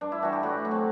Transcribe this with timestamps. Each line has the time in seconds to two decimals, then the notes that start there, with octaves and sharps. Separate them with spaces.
0.01 G2 D4
0.12 E4
0.22 E3 G3 F#4
0.33 G4
0.43 A2 F#4
0.65 F#3
0.71 C4